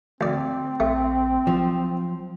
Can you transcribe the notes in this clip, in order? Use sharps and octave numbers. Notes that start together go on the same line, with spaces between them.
D2 C4 D5
A#1 A3
F3 F#3